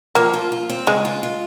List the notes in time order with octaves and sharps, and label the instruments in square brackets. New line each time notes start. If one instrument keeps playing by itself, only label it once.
[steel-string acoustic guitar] F3 [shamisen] A#3
[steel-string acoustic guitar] F4
F4
C4
[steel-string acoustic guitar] C#3 [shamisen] G#3
[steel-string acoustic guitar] F4
F4